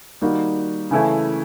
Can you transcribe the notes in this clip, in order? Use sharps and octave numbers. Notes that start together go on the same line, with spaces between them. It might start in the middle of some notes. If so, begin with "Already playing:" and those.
D#3 G3 A#3 D#4 F#4
C#3 E3 A3 C#4 E4